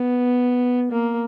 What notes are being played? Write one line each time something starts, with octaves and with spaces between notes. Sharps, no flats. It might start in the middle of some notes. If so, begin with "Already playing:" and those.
Already playing: B3
A#3